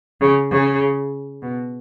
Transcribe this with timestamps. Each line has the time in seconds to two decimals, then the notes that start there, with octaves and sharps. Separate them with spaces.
0.21 C#3
0.51 C#3
1.42 B2